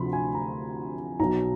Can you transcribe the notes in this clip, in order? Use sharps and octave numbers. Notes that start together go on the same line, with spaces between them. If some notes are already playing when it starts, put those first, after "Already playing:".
Already playing: D2 C3 F3 B5 C6
G#5
A#5
B1 B2 F#3 A#5